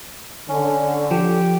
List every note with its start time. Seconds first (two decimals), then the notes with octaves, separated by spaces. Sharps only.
0.49 D3 C#4
1.11 F3 G4